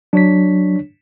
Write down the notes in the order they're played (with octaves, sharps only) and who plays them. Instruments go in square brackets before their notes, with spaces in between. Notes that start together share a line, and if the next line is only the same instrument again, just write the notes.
[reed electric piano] F#3 [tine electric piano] D4 C#5 B6